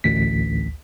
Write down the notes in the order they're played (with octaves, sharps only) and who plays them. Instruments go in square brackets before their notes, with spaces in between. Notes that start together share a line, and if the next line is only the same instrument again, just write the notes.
[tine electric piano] A1 D2 B6